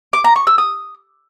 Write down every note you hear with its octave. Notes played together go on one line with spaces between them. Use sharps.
D6
A#5
C#6
E6
D#6